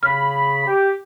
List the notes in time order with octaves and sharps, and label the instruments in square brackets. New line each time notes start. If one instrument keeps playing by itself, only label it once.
[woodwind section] C#3 B5 [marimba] F6
[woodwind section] G4